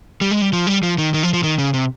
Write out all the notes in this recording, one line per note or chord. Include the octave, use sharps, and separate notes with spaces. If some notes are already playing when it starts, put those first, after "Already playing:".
G3
G#3
G3
F3
G3
F3
D#3
D#3
F3
F3
D#3
C#3
C3